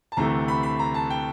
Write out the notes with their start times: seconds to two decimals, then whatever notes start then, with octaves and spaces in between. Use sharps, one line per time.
0.12 A5
0.17 D2 C3 E3 A3 A#5
0.48 B5
0.63 B5
0.79 A#5
0.94 A5
1.10 G5